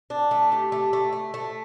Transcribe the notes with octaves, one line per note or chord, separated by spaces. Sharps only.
D4
A3
G4
A3
A3
A3
A3